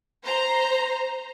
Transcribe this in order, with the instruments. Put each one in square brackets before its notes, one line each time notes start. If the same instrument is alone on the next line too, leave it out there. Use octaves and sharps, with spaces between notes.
[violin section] C5 A#5